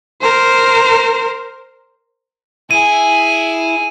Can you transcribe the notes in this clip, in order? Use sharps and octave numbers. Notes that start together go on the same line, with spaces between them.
A#4 C5
E4 G#4 G#5 D#7